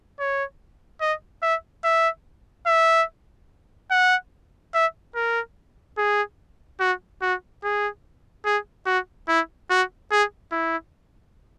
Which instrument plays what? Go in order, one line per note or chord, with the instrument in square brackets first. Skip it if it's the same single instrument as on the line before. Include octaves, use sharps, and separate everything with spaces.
[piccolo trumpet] C#5
D#5
E5
E5
E5
F#5
E5
A#4
G#4
F#4
F#4
G#4
G#4
F#4
E4
F#4
G#4
E4